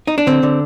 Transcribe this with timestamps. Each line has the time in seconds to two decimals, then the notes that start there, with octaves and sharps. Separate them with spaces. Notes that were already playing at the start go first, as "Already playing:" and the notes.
0.07 D#4
0.18 D4
0.27 D3 C4
0.43 D3